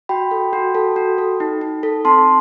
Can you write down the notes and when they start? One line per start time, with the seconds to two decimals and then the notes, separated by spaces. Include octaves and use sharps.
0.09 F#4 G5 B5
0.31 A4
0.53 F#4
0.75 A4
0.96 F#4
1.18 A4
1.40 D#4
1.61 D#4
1.83 A4
2.05 C4 A5 C6